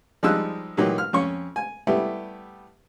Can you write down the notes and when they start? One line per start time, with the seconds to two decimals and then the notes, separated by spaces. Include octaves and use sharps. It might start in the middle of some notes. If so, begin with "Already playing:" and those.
0.23 F3 G3 G#3 D#4 E6 F#6
0.77 A#2 E3 F#3 D#4 G4
0.98 F6
1.13 F2 C#4 C#6
1.56 G#5
1.87 G3 A3 B3 E4 G4